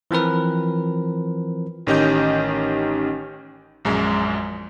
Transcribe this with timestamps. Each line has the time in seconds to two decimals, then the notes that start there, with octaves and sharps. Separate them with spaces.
0.11 E3 F3 C4 A#4 B4
1.87 A1 D#3 C#4 G4 D#5 G6
3.85 A#1 F#2 G#3